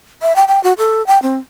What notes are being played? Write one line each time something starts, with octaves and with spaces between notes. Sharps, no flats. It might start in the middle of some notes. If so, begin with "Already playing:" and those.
E5
G5
G5
F#4
A4
G5
C4